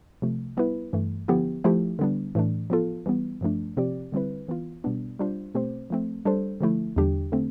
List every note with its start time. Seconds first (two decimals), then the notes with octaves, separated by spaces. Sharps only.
0.22 C3 F3 A3
0.57 G3 B3 E4 B4
0.93 G2 E3 A3
1.28 D3 F3 B3 E4 G4
1.64 F3 A3 E4 G4
1.99 D3 G3 B3 D4
2.35 A2 E3 A3 D4
2.70 F3 B3 F4 A4
3.06 E3 G3 B3
3.41 G2 F3 A3 D4
3.77 C3 F3 C4 G4 D5
4.12 D3 G3 C4 E4 B4
4.48 E3 B3 F4
4.84 B2 G3 B3 D4
5.19 G3 D4 F4 C5
5.55 B2 A3 C4 G4 C5
5.90 F3 A3 C4
6.25 G3 D4 A4 C5
6.61 D3 F3 A3 E4
6.96 E2 D3 G3 D4 G4
7.32 D3 A3 C4